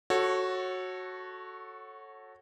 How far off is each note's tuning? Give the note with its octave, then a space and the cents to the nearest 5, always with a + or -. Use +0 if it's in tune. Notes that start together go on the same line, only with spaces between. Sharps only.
F#4 +0 A4 +0 C#5 -20